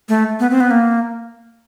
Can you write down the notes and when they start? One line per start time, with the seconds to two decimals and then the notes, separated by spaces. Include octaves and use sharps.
0.09 A3
0.40 B3
0.51 C4
0.60 B3
0.71 A#3